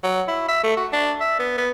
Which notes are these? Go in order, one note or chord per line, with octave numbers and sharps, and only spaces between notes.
F#3
E4
E5
A3
F#4
D4
E5
B3
B3